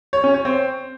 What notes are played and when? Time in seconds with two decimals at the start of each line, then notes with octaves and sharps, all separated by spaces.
0.13 C#5
0.24 C#4
0.34 C#5
0.45 C4